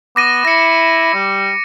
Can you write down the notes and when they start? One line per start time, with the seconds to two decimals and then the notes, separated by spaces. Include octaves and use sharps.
0.16 B3 D6 A#6 D#7
0.45 E4 A#6 C#7
1.14 G3